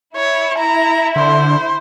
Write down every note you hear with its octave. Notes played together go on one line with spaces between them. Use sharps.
E4 C#5
A#5
D3 C5